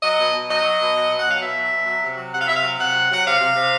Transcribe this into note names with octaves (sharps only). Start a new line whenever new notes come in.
F#3 D#5
B2
B2
F#3 D#5
F#3
B2
F#3
B2
F#5
F#3 F5
B2 E5
F#3
B2
F#3
C3
F#3
C3 F#5
F5
C3 E5
F5
F#3
C3 F#5
F#3
F#3 F#5
C3 F5
C3
C3